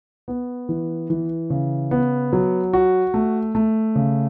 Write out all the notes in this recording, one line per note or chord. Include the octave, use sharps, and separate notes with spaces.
B3
E3
E3
C#3
B3
F#3
F#4
A3
A3
C#3